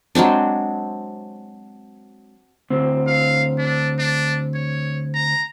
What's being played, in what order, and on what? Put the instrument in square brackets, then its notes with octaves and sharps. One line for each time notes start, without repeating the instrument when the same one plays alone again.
[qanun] F#3 G#3 C4 D4
[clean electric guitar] D2 C4
[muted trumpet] F5
D4
D4
C#5
A#5